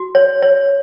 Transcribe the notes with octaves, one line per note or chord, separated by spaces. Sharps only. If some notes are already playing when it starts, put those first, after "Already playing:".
Already playing: F#4
C#5
C#5